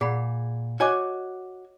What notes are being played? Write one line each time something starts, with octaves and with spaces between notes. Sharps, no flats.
A#2 G#4 F#5 B5
F#4 C#5 D#5 G#5 D6